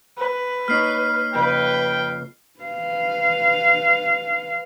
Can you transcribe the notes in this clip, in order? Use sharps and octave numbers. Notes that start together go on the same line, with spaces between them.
B4
A#3 D#4 C#5 F6 C7
F2 C#3 B4 G5
B4 F5